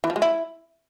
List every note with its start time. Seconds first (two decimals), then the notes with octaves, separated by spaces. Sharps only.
0.04 E3
0.10 F3
0.16 G#3
0.22 E4